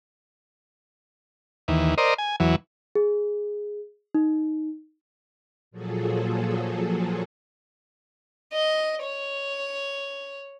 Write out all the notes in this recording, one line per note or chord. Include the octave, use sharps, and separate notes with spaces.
D#2 E3
A#4 C5 D5 D#5
G#5
E2 E3 F#3
G#4
D#4
A#2 F3 F#3 G#4 A4
D#5
C#5